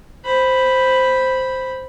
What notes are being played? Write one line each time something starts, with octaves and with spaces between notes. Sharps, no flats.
C5 B5